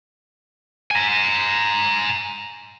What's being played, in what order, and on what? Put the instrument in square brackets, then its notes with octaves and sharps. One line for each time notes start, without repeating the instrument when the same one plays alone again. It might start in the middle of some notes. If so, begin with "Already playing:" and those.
[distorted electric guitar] G#5 A#5